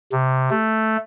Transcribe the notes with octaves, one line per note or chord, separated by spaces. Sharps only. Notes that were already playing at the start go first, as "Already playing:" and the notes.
C3
A3